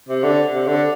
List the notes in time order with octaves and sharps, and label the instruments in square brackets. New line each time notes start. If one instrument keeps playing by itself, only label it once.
[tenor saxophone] C3
D3
C3
D3